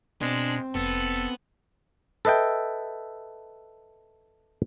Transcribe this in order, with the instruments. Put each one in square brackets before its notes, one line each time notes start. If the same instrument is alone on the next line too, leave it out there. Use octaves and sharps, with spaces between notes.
[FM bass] B2 [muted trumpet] G#3 [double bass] C4 [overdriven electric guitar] D4
[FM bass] F1 [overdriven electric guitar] B3 [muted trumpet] A4
[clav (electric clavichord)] A4 B4 D#5 E5 G5